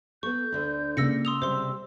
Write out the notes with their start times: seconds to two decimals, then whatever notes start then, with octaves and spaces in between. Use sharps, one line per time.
0.23 B3 A4 C#6 G6
0.52 D2 D3 D4
0.97 C#2 A#3 D4 E6 A#6 C#7
1.25 C6 D#6 E6 F7
1.42 C3 G3 C5 C6